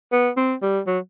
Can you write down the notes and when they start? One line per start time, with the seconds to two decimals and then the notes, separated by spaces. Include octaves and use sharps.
0.12 B3
0.37 C4
0.62 G3
0.87 F#3